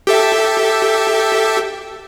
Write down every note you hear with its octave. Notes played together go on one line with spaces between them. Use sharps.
G4 A4 E5